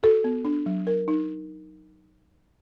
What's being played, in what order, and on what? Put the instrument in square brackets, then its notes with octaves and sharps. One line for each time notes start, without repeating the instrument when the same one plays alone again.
[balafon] F#4 [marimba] A4
[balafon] B3
D4
F#3
A#4
D#4